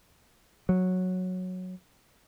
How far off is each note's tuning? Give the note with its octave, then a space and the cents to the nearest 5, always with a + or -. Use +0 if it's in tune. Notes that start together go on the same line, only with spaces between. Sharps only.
F#3 -10